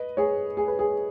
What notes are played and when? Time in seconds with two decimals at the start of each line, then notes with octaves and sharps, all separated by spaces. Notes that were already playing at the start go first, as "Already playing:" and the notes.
Already playing: B4 D#5
0.17 G#4 C#5
0.57 G#4
0.68 B4
0.79 G#4